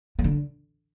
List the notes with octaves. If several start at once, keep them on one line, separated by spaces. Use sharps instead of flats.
E3
D3